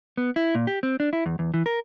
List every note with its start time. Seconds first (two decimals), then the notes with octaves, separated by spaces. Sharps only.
0.17 B3
0.36 E4
0.55 A#2
0.67 G4
0.83 C4
1.00 D4
1.13 E4
1.26 E2
1.39 E2
1.54 E3
1.66 A#4